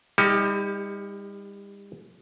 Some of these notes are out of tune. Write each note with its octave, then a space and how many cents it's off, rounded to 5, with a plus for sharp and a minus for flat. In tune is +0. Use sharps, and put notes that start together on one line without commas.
G3 +35 D#4 +35 G4 -5